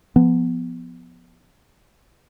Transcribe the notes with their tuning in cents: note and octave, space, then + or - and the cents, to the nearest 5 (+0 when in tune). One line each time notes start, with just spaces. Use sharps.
F3 +0 B3 +0